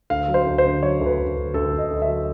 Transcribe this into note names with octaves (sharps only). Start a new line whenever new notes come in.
D2 F5
F#3
C5
D2
C5
D3
F#3 C#5
D2 B4
D2
D2
D2 A4
D2
D#5
D2
E5
F#3